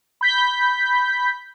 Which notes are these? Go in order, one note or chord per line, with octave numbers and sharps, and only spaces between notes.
B5 G6 B6